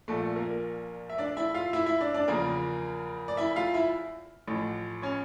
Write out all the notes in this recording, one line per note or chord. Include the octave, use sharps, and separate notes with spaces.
A#1 A#2 F3 A3 A4
A#3 A#4
E5
D4 D5
E4 E5
F4 F5
E4 E5
E4 E5
D4 D5
D4 D5
E2 C#3 F3 A#3 A#4
D5
E4 E5
F4 F5
E4 E5
A1 A2 F3
C#4 C#5